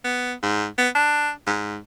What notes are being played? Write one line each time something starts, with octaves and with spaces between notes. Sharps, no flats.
B3
G#2
B3
D4
G#2